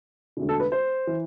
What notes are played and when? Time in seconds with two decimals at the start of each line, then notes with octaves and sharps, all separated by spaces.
0.37 E1 D2 D3
0.49 A4
0.60 B4
0.72 C5
1.07 E3